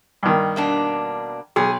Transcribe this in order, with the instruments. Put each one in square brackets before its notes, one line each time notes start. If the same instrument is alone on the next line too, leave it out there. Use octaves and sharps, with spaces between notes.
[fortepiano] G2 D#3
[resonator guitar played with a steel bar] B2 A#3 D4
[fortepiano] B1 [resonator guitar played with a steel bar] G#4